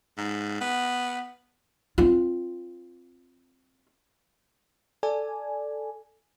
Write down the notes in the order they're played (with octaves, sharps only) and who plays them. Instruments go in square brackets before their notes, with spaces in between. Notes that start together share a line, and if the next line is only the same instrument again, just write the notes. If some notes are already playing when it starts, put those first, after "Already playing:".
[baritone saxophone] G#2
B3
[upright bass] C4 F4
[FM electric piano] A4 D5 G#5